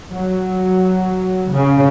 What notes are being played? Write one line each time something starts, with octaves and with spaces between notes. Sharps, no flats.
F#3
C#3